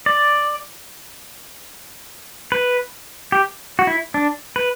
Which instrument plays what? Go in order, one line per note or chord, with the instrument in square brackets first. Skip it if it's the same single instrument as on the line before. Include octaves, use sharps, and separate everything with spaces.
[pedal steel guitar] D5
B4
G4
F#4
E4
D4
B4